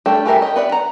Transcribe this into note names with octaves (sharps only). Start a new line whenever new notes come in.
G3 A3 D4 G4 A4
E3 G4 A4 A#4 E5
G4 D#5
B3 B4 D5 E5
F#5 A#5